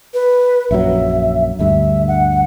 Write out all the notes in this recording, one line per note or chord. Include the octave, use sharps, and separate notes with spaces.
B4
A#1 F#2 F#3 E5
D2 G2 E5
F#5